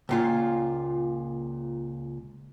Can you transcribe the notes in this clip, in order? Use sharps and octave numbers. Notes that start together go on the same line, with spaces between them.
C#2 A#2 F4